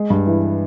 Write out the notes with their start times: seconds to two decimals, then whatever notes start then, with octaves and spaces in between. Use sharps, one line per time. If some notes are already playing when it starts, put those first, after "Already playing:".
Already playing: G#3
0.10 G2
0.27 E3